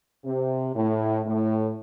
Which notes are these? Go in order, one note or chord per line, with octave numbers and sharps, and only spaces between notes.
C3
A2
A2